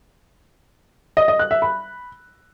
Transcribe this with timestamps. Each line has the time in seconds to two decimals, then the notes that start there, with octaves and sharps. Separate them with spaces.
1.17 D#5
1.28 D#5
1.39 F#6
1.51 E5
1.62 B5